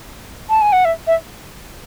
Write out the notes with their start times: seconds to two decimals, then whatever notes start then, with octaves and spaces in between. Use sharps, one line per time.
0.50 A5
0.61 G#5
0.72 F#5
0.85 E5
1.07 E5